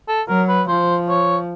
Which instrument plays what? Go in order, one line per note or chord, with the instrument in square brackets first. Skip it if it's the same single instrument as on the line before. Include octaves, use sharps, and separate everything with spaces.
[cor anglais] A4
[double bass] F#3 [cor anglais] A#4
[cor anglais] B4
[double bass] F3 [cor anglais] C5
[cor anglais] C#5